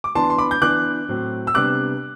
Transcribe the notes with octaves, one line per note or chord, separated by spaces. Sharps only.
D6
E3 B3 D4 A5 C6
C6
B5 D6
G6
E3 B3 D4 D6 F#6
A2 F#3 C4
E6
C3 G3 B3 D4 D6 F#6